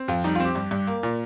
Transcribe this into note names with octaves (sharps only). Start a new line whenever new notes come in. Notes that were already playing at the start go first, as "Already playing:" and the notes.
Already playing: C4
F2 F4
G3 D#4
F4
C4 G4
G2
G2
A#3
A#2